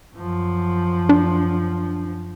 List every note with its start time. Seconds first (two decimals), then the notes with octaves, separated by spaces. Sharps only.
0.14 F#2 F3
1.09 D4